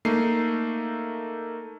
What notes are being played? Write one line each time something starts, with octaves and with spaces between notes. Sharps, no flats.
A3 A#3 D#4 C7